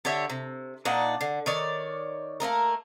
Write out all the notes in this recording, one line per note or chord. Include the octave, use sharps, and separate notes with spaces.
D3 G4 C#5 E5
C3
A#2 D4 D#4 F#5
D3
D#3 C#5 D5
A3 A#3 D#4 A#4